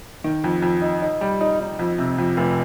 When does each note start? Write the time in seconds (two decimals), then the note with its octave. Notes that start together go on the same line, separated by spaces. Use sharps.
0.24 D#3
0.44 F2
0.62 F2
0.82 D#4
1.02 D#4
1.21 G3
1.41 D#4
1.60 D#4
1.79 F2
1.98 C3
2.18 F2
2.37 F1